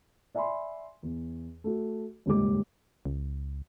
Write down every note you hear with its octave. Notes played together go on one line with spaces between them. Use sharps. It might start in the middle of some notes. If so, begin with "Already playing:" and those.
D5 E5 G#5 B5 C6
E2
A3 F#4
D#1 C#2 G#2 G4 D6
C#2